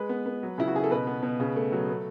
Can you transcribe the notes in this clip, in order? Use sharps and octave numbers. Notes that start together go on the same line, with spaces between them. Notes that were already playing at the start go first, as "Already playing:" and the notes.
Already playing: G#3 B4
B3
B3
F#3
C#3 E4
F#4
C#3 G#4
A4
B2 B4
B3
B2
C#3
A3
F#3
A3